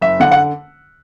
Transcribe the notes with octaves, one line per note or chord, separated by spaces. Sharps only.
F#1 E5
D3 F#5
F#5